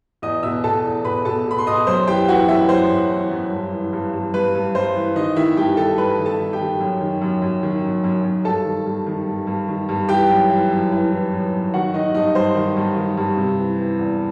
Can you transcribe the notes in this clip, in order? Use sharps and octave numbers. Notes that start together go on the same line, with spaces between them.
E2 D#5 D#6
B2 E5 E6
B2 A4 A5
E2
B2 B4 B5
B2 A4 A5
B2 B5
C6
B2 D#5 D#6
F#2 C5 C6
E3 G4 G5
E3 F#4 F#5
F#2 E4 E5
F#2 C5
F#2
E3
F#2
G2
E3
G2
G2
G2 B4
G2
G2 C5
E3
D#3 D#4 D#5
D#3 E4 E5
G2 G4 G5
D#3 A4 A5
G2 B4 B5
D#3
A4 A5
D#3
G4 G5
D#3
F#2
D#3
F#2
F#2
D#3
F#2
F#2
F#2
G2 A4 A5
D#3
G2
D#3
G2
G2
D#3
G2
E3 G4 G5
F#2
E3
F#2
E3
E3
F#2
F#2
D#3 F#4 F#5
D#3 D#4 D#5
G2 D#4 D#5
G2 C5
D#3
G2
D#3
G2
C3
E3
E3
E2